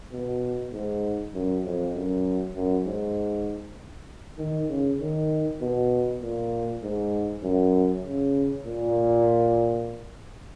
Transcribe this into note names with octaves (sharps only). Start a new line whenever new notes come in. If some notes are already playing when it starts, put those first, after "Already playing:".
B2
G#2
F#2
F2
F#2
F#2
G#2
D#3
C#3
D#3
B2
A#2
G#2
F#2
C#3
A#2